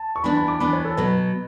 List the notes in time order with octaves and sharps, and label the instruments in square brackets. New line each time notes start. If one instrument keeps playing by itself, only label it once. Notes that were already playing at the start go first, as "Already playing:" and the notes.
Already playing: [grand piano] A5
C#6
[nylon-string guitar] E3 B3 D4 [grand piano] B5
[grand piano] B5
D6
[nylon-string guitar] E3 B3 D4 [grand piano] B5
[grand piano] C#5
A4
[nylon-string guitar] B2 F#3 B3 [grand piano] B4